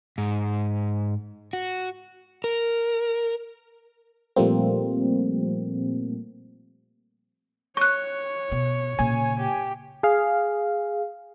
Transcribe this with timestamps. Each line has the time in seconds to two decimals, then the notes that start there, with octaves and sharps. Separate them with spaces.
0.18 G#2
1.53 F#4
2.44 A#4
4.36 A#2 F3 G3 A3 A#3 C4
7.77 C#5 C#6 F#6
8.52 B2
8.99 A#2 C#3 G#5
9.39 G4
10.03 G#4 F5